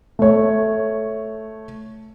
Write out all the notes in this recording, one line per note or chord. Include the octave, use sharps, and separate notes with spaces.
A3 C#5